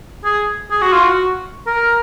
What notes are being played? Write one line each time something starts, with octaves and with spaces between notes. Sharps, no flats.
G#4
G#4
F#4
F4
F#4
A#4